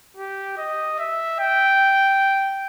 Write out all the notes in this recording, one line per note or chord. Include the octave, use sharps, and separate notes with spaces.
G4
D#5
E5
G5